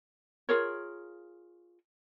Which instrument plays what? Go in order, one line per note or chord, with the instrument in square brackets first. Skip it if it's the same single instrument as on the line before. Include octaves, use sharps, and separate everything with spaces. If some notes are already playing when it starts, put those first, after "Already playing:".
[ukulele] F4 G#4 A#4 C#5